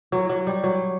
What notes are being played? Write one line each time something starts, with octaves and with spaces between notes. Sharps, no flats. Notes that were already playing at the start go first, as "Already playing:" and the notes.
F#3
F#3
G3
F#3